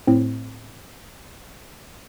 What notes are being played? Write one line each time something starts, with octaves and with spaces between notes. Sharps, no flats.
A2 C4